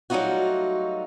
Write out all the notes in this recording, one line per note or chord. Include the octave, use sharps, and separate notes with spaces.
F#3 G3 A3 D#4 F4 F#4